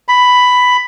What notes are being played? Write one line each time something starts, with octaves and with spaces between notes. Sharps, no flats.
B5